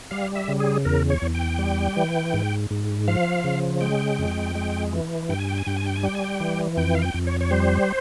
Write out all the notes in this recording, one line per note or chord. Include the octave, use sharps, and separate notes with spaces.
G3 F5
E5
C#3
G#4
E2 A#4
C#5
E2
G5
G3
E3
G#2
G#2
F3 F5
C#3
G#3 G5
F2
G#3
E3
G2 G5
G#5
G5
G#5
G2 G5
G#5
G5
G#5
G3 G5
G#5
G5
E3
F2 G5
F5
G5
F2
C#5
C#5
G3 C5